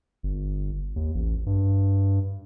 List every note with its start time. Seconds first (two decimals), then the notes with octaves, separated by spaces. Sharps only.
0.23 G1
0.96 D#2
1.15 A1
1.46 G2